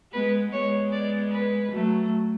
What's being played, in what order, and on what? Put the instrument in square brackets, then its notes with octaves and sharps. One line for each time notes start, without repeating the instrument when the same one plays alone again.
[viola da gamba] G#3 B3 [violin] B4
[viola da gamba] G#3 B3 [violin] C#5
[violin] D5
B4
[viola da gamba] F#3 A3